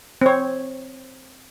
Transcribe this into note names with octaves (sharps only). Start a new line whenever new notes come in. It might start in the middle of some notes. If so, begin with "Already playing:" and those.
C4 C#5